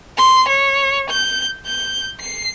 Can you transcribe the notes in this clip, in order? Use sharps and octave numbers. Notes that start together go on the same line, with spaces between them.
C6
C#5
G6
G6
C7